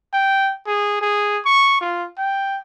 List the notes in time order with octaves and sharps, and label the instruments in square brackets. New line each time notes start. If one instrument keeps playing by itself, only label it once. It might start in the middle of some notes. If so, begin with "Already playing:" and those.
[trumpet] G5
G#4
G#4
C#6
F4
G5